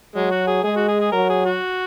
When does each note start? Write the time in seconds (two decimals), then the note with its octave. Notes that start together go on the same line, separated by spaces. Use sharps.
0.15 F#3 G#3
0.31 F#4
0.47 G#4
0.64 G#3 G#4
0.76 F#4
0.88 G#4
1.00 G#4
1.12 F#3 A#4
1.29 G#4
1.45 F#4